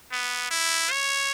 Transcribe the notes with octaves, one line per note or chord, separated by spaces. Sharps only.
B3
E4
C#5